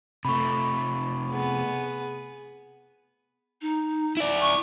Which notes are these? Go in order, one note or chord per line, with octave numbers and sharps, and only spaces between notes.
C3 A3 B5 C#6
B3 G#4
D#4
E4 D5
C#6